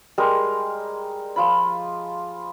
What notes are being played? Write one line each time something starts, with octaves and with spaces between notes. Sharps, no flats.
G3 G#3 A#4
F3 F4 B5